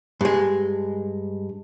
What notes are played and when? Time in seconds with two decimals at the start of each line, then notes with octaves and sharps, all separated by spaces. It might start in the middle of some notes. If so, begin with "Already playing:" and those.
0.21 G2 G#3